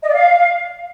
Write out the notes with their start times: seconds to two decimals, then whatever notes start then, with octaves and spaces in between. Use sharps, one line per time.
0.02 D#5
0.07 D5
0.13 F5